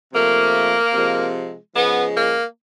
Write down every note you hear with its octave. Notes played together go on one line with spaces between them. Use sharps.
C3 F3 A3 A#3
C3 F3 G#3
C#3 F3 G#3 B3
A#3